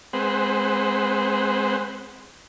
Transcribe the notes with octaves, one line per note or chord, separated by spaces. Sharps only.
G#3 C4 B4 C5 F#5